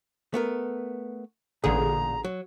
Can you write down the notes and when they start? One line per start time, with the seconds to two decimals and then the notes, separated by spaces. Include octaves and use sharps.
0.34 A3 B3 A#4
1.64 A1 A#2 D3 G#4 A#5
2.25 F#3